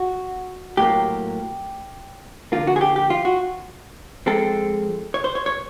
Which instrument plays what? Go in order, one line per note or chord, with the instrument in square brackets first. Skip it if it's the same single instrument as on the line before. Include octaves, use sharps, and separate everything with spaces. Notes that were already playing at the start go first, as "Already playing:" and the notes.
Already playing: [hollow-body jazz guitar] F#4
A2 F#3 A#3 G4
D3 F3 A#3 F4
F#4
G#4
G4
G4
F4
F#4
F3 G#3 C4 A4
C#5
C5
C#5
C#5